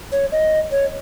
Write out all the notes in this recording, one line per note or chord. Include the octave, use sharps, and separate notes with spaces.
C#5
D#5
C#5